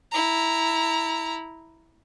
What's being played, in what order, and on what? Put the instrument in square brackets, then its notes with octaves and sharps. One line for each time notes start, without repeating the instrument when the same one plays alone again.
[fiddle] E4 A#5